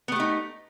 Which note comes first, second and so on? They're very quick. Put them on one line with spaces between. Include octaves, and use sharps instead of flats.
B3 A3 G4 D#4